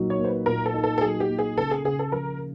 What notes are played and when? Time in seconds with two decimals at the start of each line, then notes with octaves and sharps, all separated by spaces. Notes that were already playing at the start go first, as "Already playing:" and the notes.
Already playing: A#2 F#3 D#4
0.10 C#5
0.19 A#3
0.24 C5
0.28 B4
0.46 A#2 A#4
0.66 A4
0.74 D#4
0.84 A4
0.98 A4
1.01 F#3 G#4
1.20 G4
1.29 A#3
1.39 G#4
1.57 C#3 A4
1.71 G#4
1.84 C#3 G#4
1.99 A4
2.12 F3 A#4